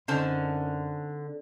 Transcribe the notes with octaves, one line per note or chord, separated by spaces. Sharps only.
F#2 D3 C4 C#4 D#4 C5 A5